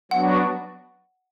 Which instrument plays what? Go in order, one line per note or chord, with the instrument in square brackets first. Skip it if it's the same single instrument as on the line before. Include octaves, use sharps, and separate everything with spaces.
[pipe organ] F#3 B3 D4 F#4 [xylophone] F#5